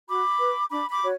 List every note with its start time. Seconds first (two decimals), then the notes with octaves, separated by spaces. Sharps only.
0.08 F#4 B5 D6
0.39 B4
0.70 D4 B5 D6
0.90 B5 D6
1.01 F#4 C#5